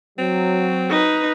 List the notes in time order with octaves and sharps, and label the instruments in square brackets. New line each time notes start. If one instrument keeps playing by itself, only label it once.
[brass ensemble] F#3 [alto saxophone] C4
[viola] D#4 B4